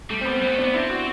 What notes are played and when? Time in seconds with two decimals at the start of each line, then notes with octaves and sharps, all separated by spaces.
0.10 G3 A3
0.21 C4
0.25 B3
0.42 G3 C4
0.47 B3
0.53 A3
0.58 D4
0.64 B3
0.74 C4 E4
0.90 F#4